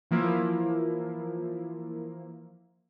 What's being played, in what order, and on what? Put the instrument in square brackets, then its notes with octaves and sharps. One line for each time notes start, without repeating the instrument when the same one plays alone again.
[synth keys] E3 F3 A#3 E4 F4